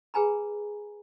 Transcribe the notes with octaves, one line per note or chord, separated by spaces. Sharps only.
G#4 B4 G#5 A#5 B5